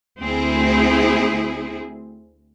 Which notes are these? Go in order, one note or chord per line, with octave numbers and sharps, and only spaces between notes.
D2 C4 E4 G#4